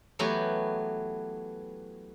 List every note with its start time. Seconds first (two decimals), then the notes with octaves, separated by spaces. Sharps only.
0.19 E3 F#3 A3 B3 G4